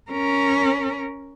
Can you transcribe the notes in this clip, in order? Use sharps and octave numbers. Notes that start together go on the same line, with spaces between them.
C#4 A#4